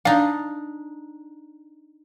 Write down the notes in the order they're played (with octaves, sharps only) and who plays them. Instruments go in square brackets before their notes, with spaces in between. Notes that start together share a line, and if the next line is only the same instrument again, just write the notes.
[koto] D4 D#4 [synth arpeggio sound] F5